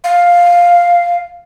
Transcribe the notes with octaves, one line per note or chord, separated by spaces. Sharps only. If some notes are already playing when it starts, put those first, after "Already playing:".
F5